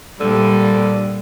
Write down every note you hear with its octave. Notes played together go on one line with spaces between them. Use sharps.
A#2 D3 G3